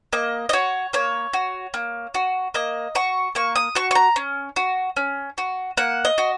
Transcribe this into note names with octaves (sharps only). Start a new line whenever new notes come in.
A#3 D#5
D#5
F#4 C#5
A#3 C#5
F#4
A#3
F#4
A#3 D#5
F#4 C#6
A#3 C#6
D#6
F#4 C#6
C#6
A#5
C#4
F#4
C#4
F#4
A#3 F#5
D#5
F#4